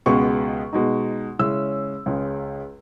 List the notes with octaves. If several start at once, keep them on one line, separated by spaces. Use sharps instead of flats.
C#2 B2 G#3 B3 C#6
B2 G#3 D#4
C#3 G#3 C#4 E4 E6
C#2 C#3 G#3